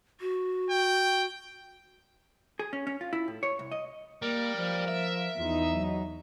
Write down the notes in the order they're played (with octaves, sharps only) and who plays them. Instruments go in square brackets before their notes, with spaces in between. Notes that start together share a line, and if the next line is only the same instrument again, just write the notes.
[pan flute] F#4
[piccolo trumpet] G5
[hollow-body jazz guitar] G#4
C#4
C#4
F4
E4
A2
C#5
C2
D#5
[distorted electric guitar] G3 [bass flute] A#3 [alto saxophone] A#4
[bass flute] F3
[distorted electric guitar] E5
[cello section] E2 D#4 [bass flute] F4
[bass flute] F#3